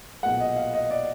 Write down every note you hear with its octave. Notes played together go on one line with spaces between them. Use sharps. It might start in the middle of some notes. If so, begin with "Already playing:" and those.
B1 A#2 G#3 F#5
D#5
F5
D#5
D5